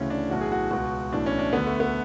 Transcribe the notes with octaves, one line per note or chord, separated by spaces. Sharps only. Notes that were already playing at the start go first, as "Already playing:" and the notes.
Already playing: D2 C#3 E3 C#4
D4
B1 A2 E3 F#4
G#4
F#4
C#2 B2 F#4
B1 A2 E3 D4
C#4
D4
D2 D3 B3
A3
B3